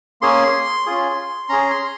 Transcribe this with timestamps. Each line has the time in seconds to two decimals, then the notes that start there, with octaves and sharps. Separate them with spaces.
0.21 A#3 C#4 G#4 C6
0.86 C#4 F4 G#4
1.49 C#4 G#4 A#5
1.71 C6